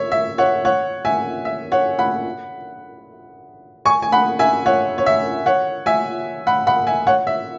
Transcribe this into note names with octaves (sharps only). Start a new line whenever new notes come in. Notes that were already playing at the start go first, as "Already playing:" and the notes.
Already playing: C#5 E5
E5
C#5 F#5
C#5 F#5
E5 G#5
E5
C#5 F#5
F#5 B5
G#5 C#6
G#5
F#5 B5
E5 G#5
C#5 F#5
C#5
E5
C#5 F#5
E5 G#5
F#5 B5
F#5 B5
E5 G#5
C#5 F#5
E5